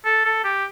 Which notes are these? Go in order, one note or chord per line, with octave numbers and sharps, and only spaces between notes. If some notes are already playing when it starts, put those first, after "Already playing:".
A4
A4
G4